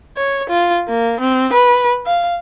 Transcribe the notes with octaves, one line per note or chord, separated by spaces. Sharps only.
C#5
F4
A#3
C4
B4
F5